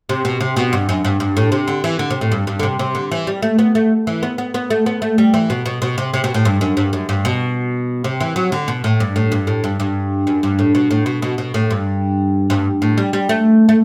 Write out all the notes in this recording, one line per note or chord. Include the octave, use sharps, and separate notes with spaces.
C3
B2
C3
B2
G2
F#2
G2
G2
A2
C3
D3
E3
D3
C3
A2
G2
G2
D3
C3
C3
D3
E3
G3
A3
B3
A3
E3
B3
B3
B3
A3
B3
A3
G3
E3
B2
B2
B2
C3
C3
B2
A2
G2
F#2
G2
F#2
G2
B2
C3
E3
F#3
D3
B2
A2
G2
A2
G2
A2
G2
G2
F#2
G2
A2
B2
A2
B2
B2
B2
A2
G2
G2
A2
G3
G3
A3
A3